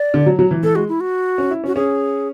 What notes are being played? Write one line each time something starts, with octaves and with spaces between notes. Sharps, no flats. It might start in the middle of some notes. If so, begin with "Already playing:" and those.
Already playing: D5
D3
F#3
F#3
E3
E3 A4
G#3 F#4
E4
F#4
C#4
E4
C#4 F#4
C#4 G#4